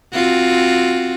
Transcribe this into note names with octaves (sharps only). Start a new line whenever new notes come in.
C4 F4 F#4